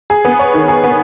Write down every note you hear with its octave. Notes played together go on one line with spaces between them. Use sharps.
G#4
B3
C#5
D#3
G#4
B3